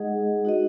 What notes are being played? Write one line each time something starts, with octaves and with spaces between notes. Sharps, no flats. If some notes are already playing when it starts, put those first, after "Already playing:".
Already playing: G#3 D#4 G#4 D#5 F#5
D#4 F#4 B4 D#5